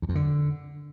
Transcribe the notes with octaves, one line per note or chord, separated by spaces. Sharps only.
E2
F2
D3